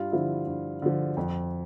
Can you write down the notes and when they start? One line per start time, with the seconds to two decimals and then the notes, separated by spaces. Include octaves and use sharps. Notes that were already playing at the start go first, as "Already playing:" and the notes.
Already playing: G2 F4
0.12 D3 F3 E4
0.47 G2
0.82 D3 F3
1.17 F2